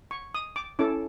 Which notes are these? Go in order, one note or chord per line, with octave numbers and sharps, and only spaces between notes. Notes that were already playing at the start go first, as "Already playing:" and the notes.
C#6
D#6
D6
C#4 E4 A4 D6